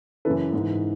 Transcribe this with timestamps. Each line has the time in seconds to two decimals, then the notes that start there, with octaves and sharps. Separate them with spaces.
0.25 F#2 C#3 E3 A4 B4
0.53 G#2
0.58 E3